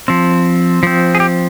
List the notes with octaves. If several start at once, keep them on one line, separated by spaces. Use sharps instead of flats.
F3 C4
F3 C4
G#4
G4